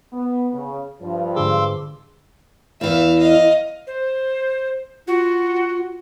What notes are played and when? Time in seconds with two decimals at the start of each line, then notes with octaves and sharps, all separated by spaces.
0.13 B3
0.53 C#3
1.01 G2 F3
1.35 G#2 D3 G#4 C6 D6 E6
2.81 E2 E3 E5 F5
3.18 D#5 F5
3.87 C5
5.07 F4 F#4